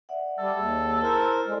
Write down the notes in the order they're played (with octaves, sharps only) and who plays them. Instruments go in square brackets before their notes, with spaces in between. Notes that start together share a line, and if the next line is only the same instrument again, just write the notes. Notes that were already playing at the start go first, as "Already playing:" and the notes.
[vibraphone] D5 E5 F#5
[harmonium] G3 [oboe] A4
[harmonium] D#2 [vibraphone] G#4
[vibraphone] E4 A5 [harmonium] A#4 C5
[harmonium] G#3 [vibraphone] E4 A4 D5